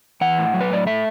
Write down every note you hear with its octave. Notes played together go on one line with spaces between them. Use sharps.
E3 F#5
A2
F#3
B4
A2 D5
A3 E5